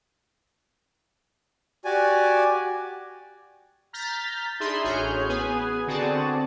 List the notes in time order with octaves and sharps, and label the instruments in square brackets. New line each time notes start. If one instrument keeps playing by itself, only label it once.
[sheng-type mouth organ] F#4 G4 D5 G#5
[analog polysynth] A#5 F6 G6 A6 B6
D4 D#4 G#4 E5 B5 C6
A1 F#4 G#4 C#5 F6 G6
B3 G#4 B4 G#5
D3 C4 F#4 G#4 D5 A5